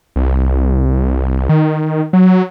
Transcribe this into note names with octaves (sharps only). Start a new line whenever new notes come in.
C2
D#3
F#3